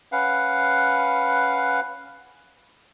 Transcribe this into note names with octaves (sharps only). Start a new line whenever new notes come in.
C#4 B4 F5 F#5